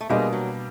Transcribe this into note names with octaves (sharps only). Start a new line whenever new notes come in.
A3
B2 G3 G#3 A#3 D4
F#3